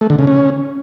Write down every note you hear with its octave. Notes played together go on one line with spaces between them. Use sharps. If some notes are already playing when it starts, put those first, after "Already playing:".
A3
D3
C#3
C#4